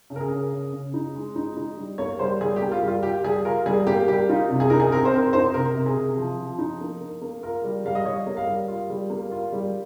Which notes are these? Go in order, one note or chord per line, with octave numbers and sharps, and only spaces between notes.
C#3
A#4
G#4
C#3
C#3
C#3
D#4
G#3
D#4
D#4
G3
A#3 C#5
G3 C5
G3 G#4
G4
A#3
F4
G3
F4
F4 G4
G3 G#4
F4 A#4
G3 G#4
A#3 G4
G3 G4
D#4 F4
C3
G#4
D#4 A#4
G#4
C4 A#4
C5
C4 A#4
D#4 C5
C3 A#4
C3
G#4
C3
F3
F3
D#4
A#3
A#3
A#3
F4 A#4
G3
G3 F5
D#5
G3 C#5
A#3
F5
G3
F4
G3
A#3
F4
G3